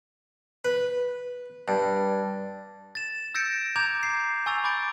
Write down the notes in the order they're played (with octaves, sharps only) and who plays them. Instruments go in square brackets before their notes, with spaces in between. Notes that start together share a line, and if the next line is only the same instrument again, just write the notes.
[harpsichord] B4
G2
[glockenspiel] A6 E7
E6 G6 A6 A#6 C#7 D7
A#5 D6 G6 G#6 F7
C7
G#5 C#6 E6 A6 F7
B5 D6 G6 A6 D7